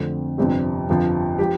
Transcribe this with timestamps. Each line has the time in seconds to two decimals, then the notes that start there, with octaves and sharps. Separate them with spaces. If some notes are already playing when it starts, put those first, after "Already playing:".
Already playing: F2 D3 A3 C4
0.38 G1 F2 C3 G3 C4 G4
0.89 G1 F2 F3
1.39 F3 G4